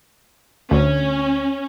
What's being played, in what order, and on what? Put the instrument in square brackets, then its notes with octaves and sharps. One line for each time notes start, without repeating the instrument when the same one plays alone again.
[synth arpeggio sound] D2 [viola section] C#4